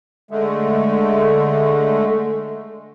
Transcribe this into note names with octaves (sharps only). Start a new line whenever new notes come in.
D3 G#3 A3